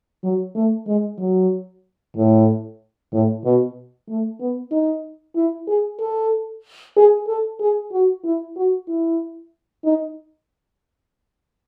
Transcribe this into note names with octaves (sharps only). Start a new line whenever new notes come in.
F#3
A3
G#3
F#3
A2
A2
B2
A3
B3
D#4
E4
G#4
A4
G#4
A4
G#4
F#4
E4
F#4
E4
D#4